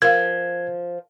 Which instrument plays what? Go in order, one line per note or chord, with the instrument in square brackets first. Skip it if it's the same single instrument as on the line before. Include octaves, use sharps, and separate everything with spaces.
[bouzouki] F3 [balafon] A#4 F5 [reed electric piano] G#6